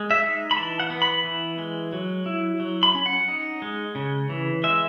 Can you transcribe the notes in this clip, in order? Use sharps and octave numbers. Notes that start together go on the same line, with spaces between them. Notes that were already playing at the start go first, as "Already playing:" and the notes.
Already playing: G#3
E5
D#4
B5
E3 A5
F#5
B3
B5
E3
G#3
F#3
E4
F#3
B5
C#4
F#5
D#4
G#3
C#3
E3
G#3 E5